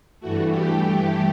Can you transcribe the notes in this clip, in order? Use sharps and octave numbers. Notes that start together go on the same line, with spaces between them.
G2 E3 A3 F#4
G4